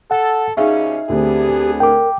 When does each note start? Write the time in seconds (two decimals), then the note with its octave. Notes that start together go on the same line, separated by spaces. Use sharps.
0.11 A4 F#5
0.57 B2 G3 C#4 D#4 G#4 E5 F5
1.09 D2 B3 C4 D4 G4 G#4
1.80 A#4 G5 D6